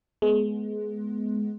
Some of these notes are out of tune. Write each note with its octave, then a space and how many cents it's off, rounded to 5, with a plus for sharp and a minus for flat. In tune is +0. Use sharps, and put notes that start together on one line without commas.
G#3 +25 B3 +0